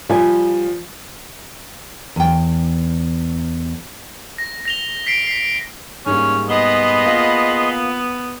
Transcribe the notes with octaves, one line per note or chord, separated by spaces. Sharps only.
F3 G3 G#5
E2 G5
A#6
A#6 F7 G7
B6 C7 D7
B6 C7
G#2 G3 A#3 C#4
B3 G#4 D#5 B5 C6
A#3 F4